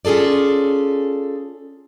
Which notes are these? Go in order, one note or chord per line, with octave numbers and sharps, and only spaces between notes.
C#4 F4 G#4 A4 D5